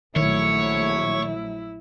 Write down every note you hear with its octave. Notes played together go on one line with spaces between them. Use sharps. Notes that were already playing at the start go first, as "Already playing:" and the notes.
A#1 D#3 F#3 A3 E4 C#5